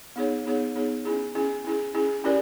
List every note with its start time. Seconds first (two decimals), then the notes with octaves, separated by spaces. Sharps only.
0.16 B3 D#4 G#4 C#5
0.45 B3 D#4 G#4 C#5
0.76 B3 D#4 G#4 C#5
1.05 C#4 E4 G#4
1.35 C#4 E4 G#4
1.64 C#4 E4 G#4
1.95 C#4 E4 G#4
2.24 C#4 E4 G4 A#4 D5